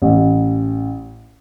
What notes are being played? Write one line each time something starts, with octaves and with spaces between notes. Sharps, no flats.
A1